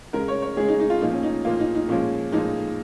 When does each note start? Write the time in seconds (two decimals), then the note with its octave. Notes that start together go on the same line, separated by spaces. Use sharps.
0.13 C#3 G#3 A#4
0.28 C#5
0.42 C#5
0.57 C#3 G#3 G#4
0.68 D#4
0.80 D#4
0.90 F4
1.01 A#2 F3 A#3 D#4
1.11 C#4
1.23 D#4
1.45 A#2 F3 A#3 F4
1.59 D#4
1.75 D#4
1.89 A#2 F3 G#3 C#4
2.32 A#2 F3 G#3 D#4